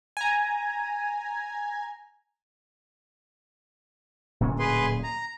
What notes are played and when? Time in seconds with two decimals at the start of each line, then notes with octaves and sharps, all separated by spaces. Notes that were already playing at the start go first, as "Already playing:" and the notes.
0.17 G#5 A#5
4.40 D1 A#2 C#4
4.59 G#4 B4 C6
5.04 A#5